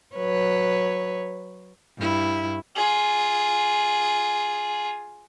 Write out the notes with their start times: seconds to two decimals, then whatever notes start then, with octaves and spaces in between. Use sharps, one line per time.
0.16 F#3 B4 C#5
1.98 G2 E4
2.76 F4 G#4